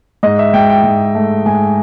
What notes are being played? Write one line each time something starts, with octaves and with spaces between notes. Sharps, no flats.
G#2 D#5
E5
G#2 G5
G5
G#2
A3
G#2 G#5